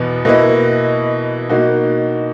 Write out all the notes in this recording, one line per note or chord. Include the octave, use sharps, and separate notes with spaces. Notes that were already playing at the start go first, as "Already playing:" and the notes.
Already playing: E2 B2 B3
B2 A#3 E4 B4 D#5
B2 A#3 D#4 F#4